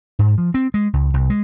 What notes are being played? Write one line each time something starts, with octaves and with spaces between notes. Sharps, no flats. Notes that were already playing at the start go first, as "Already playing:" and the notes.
G#2
F3
C4
G#3
C#2
C2
G#3